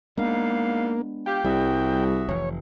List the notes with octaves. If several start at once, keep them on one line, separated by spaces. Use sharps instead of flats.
G#2 G3 G#3 A#3 B3 D4 F5
F4 G4 G5
C2 G3 F#4 G#4 E5
F1 E3 C#5